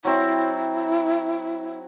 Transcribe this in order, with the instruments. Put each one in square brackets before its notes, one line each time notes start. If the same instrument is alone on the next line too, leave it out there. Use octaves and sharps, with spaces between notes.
[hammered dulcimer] F#3 C4 [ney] E4